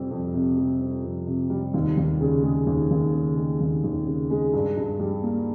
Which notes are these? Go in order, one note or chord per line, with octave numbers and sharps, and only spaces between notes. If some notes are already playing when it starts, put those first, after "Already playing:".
Already playing: F2 C3 G3 C4
F2
C3
G3
C4
F2
C3
G3
D#2
D#2
C#3
G#3
D#2
D#2
C#3
G#3
D#2
D#2
C#3
G#3
G2
G2
G3
A#3